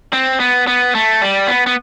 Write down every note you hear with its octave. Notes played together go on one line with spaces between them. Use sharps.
C4
B3
B3
A3
G3
B3
B3